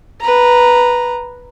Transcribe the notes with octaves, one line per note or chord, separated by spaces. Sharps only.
B4 A#5